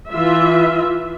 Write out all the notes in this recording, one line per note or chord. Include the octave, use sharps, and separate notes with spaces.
E3 F4 E5